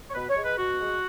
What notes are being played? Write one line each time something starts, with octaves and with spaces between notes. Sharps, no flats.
C#5
B2 B4
C#5
G#3
B4
B2 F#4
G#3